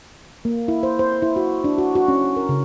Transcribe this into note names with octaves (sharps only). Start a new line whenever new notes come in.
A#3
E4
C5
C5
E4
F#4
D4
F#4
F#4
C#4
A#4
C#3